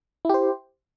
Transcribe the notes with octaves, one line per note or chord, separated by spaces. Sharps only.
E4 G4 C5